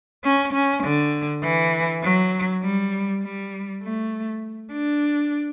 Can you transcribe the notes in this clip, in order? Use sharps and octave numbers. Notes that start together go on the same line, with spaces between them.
C#4
C#4
D3
E3
F#3
G3
G3
A3
D4